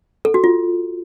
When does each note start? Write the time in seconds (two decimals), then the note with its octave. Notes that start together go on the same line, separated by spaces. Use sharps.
0.25 A4
0.34 F#4
0.44 F4